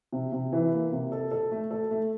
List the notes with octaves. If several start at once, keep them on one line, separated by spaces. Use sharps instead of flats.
C3
C3
E3
A#3
C3
A4
A4
A3
A4
A3